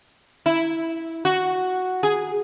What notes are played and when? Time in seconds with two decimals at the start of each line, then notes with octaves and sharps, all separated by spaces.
0.46 E4
1.25 F#4
2.03 G#4